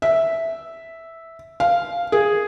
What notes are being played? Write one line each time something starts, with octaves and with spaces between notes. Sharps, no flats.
E5
F5
G#4